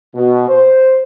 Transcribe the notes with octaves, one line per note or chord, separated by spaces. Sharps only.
B2
C5